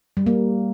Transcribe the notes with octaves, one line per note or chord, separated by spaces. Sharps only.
G3
A#3